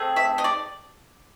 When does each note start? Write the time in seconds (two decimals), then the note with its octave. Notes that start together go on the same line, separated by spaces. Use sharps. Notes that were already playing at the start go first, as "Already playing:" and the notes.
Already playing: A3 C4 G#4
0.16 E5
0.38 D#5
0.44 D5